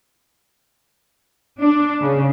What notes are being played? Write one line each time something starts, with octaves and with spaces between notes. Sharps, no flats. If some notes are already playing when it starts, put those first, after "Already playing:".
D4
C#3